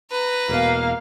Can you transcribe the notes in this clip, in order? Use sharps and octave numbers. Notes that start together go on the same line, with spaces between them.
B4 A#5
E1 B2 A#3 F5